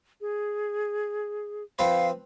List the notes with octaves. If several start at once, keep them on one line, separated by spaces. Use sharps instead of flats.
G#4
F3 C4 B4 F5